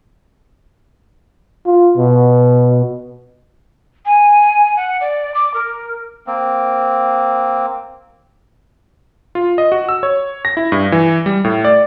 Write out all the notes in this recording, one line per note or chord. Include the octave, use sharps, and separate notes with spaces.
F4
B2
G#5
F#5
D5
D6
A#4
A#3 C4
F4
D#5
F#4
E6
C#5
A#6
E4
G2
E3
G3
A2
D5